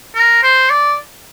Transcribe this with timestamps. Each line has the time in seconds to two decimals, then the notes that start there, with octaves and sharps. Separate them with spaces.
0.15 A#4
0.43 C5
0.70 D5